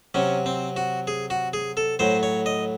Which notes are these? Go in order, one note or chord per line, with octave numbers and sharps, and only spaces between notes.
C3 F#3 C#4
C4
F#4
G#4
F#4
G#4
A4
A2 F#3 C5
C#5
D#5